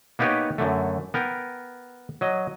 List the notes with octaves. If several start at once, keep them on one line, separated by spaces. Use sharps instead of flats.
A#3 B3 D#4 G4 B4 C#5
F#2 D3 A3
B3 A#4 G5
F#3 D#5